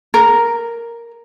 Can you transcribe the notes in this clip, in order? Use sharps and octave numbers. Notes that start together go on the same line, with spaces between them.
A#4